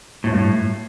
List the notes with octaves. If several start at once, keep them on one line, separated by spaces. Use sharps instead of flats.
A2
G2
A2